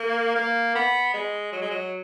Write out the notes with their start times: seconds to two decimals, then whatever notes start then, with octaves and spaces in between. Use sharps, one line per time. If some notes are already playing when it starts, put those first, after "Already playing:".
Already playing: A#3
0.36 A#3
0.75 B3
1.14 G#3
1.52 F#3
1.62 G#3
1.71 F#3